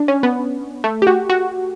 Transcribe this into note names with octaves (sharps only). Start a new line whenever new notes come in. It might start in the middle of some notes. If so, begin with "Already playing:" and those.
Already playing: D4
C#4
B3
A3
G4
F#4
F#4